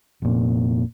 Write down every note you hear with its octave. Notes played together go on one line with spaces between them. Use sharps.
F1 A#2